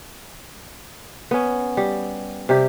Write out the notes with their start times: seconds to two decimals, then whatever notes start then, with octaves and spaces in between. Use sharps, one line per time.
1.31 B3 C#4
1.77 G3
2.49 C3 G3 G4